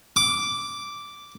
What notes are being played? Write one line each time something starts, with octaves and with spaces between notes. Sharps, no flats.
D6